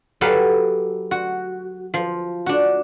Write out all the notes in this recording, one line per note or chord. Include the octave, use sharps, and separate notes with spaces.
F#3 G4 A4 B4 F5
F#4
F3
D4 F#4